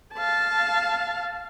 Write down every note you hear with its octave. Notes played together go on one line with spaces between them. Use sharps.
F5 A5